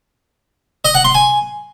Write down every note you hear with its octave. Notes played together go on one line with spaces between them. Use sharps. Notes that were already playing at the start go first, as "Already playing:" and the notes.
D#5
F#5
C6
G#5